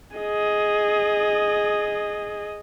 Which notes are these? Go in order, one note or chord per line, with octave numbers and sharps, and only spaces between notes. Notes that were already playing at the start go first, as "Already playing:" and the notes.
G#4 D#5